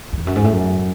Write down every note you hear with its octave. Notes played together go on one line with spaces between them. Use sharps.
F#2
E2
F#2
G#2
A2
F#2